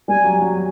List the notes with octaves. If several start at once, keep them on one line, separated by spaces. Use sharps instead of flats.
G3 G#5
F#3
F#3